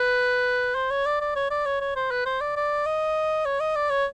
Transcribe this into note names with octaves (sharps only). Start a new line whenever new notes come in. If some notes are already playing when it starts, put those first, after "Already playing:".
Already playing: B4
C5
C#5
D5
D5
C#5
D5
C#5
C#5
C5
B4
C5
D5
D5
D#5
C#5
D#5
D5
C#5